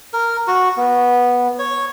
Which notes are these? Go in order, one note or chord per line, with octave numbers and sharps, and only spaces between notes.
A#4
F#4
B3
C#5